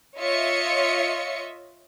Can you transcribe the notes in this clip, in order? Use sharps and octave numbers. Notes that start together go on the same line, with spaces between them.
F4 C#5 D#5 E5 C#7